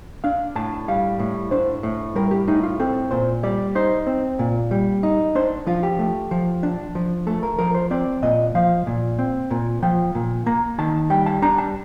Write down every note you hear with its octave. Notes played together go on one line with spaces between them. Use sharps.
D4 F5
A2 A5
G3 F5
A2
D4 C5
A2
G3 A#4
G4
A2 D#4
F4
C4 A4
A#2 C5
G3 D5
D#4 C5
C4
A#2
G3
D#4
D4 C5
F3 F4
G4
A3
F3
D4
F3
A3 A4
A#4
F3 A#4
C5
C4 D5
A#2 D#5
F3 F5
A#2
C4
A#2
F3 G5
A#2
A#3 A#5
D#3 A5
G3 G5
A5
D4 A#5
A5